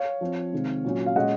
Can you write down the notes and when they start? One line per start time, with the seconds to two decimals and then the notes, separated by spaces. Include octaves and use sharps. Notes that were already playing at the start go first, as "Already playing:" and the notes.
Already playing: C#5 F5
0.21 F3 C4
0.53 C3 D#3 G#3 C4
0.85 A#2 F#3 C#4
1.06 F5
1.16 A#2 G#3 C#4 D#5 F#5